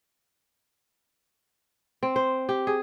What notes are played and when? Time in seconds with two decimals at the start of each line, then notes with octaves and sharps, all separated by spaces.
2.03 C4
2.16 C5
2.49 G4
2.67 G#4